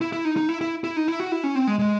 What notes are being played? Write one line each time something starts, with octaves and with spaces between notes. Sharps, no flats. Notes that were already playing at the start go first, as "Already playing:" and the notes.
E4
E4
D#4
D#4
E4
E4
E4
D#4
E4
F#4
E4
C#4
C4
G#3
G#3